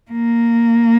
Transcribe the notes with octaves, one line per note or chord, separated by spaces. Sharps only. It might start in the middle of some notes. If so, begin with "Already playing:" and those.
A#3